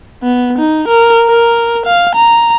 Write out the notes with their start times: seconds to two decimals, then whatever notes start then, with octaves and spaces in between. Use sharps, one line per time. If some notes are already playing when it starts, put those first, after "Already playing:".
0.23 B3
0.59 D#4
0.88 A#4
1.27 A#4
1.86 F5
2.16 A#5